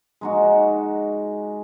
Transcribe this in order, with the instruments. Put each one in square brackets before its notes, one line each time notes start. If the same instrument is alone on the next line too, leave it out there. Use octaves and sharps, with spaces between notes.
[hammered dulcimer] G#3 D#4 F#4